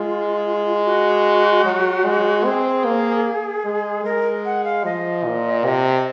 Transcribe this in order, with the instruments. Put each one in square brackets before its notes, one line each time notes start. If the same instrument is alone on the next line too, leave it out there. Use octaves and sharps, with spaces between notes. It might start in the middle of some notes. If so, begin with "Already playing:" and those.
Already playing: [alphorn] G#3 [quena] F4
[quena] F#4
[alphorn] F#3
G#3
[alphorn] C4 [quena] G#4
[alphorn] A#3
G#3
[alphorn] G#3 [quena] A#4
[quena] F#5
F5
[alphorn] F3 [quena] D#5
[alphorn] A#2
C3